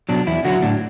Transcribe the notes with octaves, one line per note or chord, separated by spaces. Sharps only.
B2 F#3 D4
E2 E4
D3 F#3 F#4
A2 D4